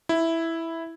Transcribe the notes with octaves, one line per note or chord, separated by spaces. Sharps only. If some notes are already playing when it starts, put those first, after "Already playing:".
E4